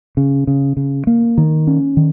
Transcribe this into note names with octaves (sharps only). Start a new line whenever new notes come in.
C#3
C#3
C#3
A#3
D#3
C#4
D#3